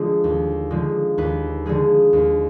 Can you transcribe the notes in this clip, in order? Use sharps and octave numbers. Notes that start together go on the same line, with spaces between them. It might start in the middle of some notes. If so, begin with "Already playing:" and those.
Already playing: D3 F3 G#3
D#2
D3 F3 G#3
D#2 B4
D3 F3 G#3 G#4
D#2